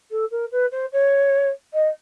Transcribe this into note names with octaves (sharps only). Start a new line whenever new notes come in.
A4
A#4
B4
C5
C#5
D#5